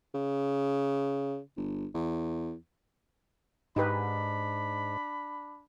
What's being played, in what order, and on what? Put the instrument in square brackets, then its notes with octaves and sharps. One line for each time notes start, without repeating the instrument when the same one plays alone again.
[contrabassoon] C#3
G1
E2
[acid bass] G#2 [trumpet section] D4 B5 [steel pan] D#4 G4 B4